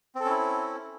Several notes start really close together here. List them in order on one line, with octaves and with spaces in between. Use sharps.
C4 A4 C#4 E4